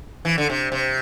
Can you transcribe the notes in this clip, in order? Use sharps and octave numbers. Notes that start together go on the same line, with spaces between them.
E3
D3
C3
C3